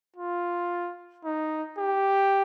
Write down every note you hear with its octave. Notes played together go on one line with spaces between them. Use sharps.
F4
D#4
G4